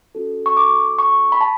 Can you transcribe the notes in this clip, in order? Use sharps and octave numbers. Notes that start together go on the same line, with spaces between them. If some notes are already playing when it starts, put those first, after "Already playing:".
C#4 F#4 A4
C#6
D6
C#6
B5
A5